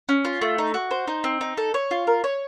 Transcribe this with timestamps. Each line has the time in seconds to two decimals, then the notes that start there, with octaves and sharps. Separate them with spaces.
0.09 C#4
0.25 F4
0.41 A3
0.58 D#4
0.74 F#4
0.91 C5
1.07 D#4
1.24 C4
1.41 D#4
1.58 A4
1.74 C#5
1.91 F4
2.07 A#4
2.24 C#5